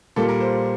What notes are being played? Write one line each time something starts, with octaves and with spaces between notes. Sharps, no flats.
A#2 G3 A#3 A4
A#4
C5